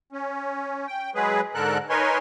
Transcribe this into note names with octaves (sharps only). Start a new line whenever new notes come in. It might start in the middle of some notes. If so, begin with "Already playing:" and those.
C#4
G5
F#3 G#3 G#4 B4
G#2 D3 A4 A#4 F#6
D#4 A#4 B4 C#5 G#5 C6